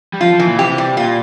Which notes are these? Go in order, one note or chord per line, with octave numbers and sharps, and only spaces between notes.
G3
F3 F4
F3
E3
A#2
C3 G4
G3
A#2 F4